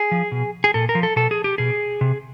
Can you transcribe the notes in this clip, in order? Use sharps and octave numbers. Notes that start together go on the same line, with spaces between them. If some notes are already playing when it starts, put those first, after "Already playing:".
Already playing: G#4
F3
B2
G#4
A#2 A4
A#4
F3
A4
B2 A4
G#4
G4
B2 G#4
C3